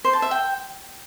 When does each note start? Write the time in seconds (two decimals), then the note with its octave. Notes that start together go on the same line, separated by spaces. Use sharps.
0.04 C5
0.13 A5
0.22 E5
0.31 G5